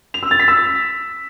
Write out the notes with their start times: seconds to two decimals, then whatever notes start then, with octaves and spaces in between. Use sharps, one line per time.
0.14 F7
0.23 E6
0.31 A6
0.39 B6
0.48 E6